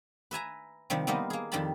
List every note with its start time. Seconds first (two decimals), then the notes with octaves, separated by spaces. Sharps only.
0.31 B4 E5 G#5 A#5
0.90 C3 D#3 F3 G3
1.07 G3 A#3 B3 D#4 F4 D#5
1.30 A#3 G#4
1.52 F2 D#3 G3 G4 A5 B5